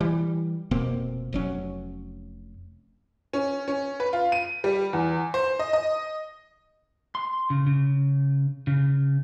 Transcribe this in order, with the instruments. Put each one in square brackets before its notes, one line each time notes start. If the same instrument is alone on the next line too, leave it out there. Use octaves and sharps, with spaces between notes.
[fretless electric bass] E3 G3
F1 B2 A#3 C4
F1 F#3 C#4
[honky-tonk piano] C#4
C#4
B4
F4
D#7
G3
E2
C5
D#5
D#5
[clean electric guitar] C6
C#3
C#3
C#3